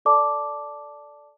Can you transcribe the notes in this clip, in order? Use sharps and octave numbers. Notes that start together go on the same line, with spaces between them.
A4 D5 A5 D6